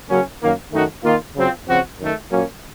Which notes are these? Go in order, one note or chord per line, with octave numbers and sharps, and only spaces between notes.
C#3 F#3 A#3 C#4
F#2 D#3 A#3
F#2 D#3 A3 D#4 F#4
D#3 A#3 F4
C#3 F#3 C4 F4
C#3 F3 C4 F#4
F#2 D#3 A3
A#2 F#3 A#3 C#4